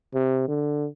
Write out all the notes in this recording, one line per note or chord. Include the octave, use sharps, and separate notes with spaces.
C3
D3